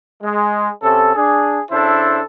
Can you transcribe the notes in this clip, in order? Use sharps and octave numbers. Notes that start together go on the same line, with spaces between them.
G#3
C3 C#4 A4
D4 G#4
C#3 D4 E4 A4 C5